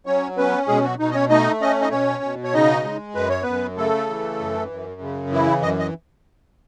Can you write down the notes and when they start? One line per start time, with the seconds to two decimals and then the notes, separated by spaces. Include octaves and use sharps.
0.06 F#3 C#4 C#5
0.37 B3 C#4 B4
0.68 B2 G#3 G#4
0.84 F#3 F#4
0.99 B2 D#4
1.11 D#5
1.14 C#4 C#5
1.30 A3 D#4 D#5
1.61 C#4 D#5
1.82 D#4 D#5
1.91 B2 C#4 C#5
2.23 B2
2.44 C#5
2.54 C#3 D#4 D#5
2.84 G#3
3.15 F#2 B4
3.29 C#5
3.43 F#2 B3 B4
3.77 C#3 A3 A4
4.09 E3
4.40 F#2
4.70 F#2
5.01 C#3
5.32 E3 E4
5.62 F#2 D#5
5.79 D#5